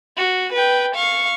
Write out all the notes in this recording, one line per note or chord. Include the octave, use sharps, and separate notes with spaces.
F#4
B4 G5
F5 C#6